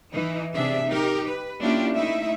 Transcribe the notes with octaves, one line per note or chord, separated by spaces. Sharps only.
E3 D#4
C3 D4 G#4 E5
D#4 G4 A#4
B4
A#3 C#4 D4 E4 F4 G4
A3 D#4 E4 E5